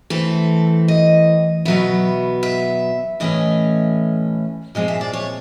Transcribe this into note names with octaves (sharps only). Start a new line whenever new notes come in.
E3 A3 C4 A4
D#5
B2 F#3 B3 E5
E5
A2 E3 A3 C#4 D#5
A#2 F3 G#3 C4 D#5
E5
D5
C#5